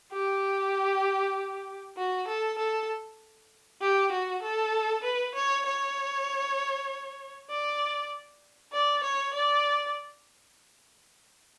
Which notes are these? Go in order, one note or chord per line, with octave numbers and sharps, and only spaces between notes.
G4
F#4
A4
A4
G4
F#4
A4
B4
C#5
C#5
D5
D5
C#5
D5